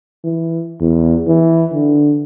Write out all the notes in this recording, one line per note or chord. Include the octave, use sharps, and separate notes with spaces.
E3
E2
E3
D3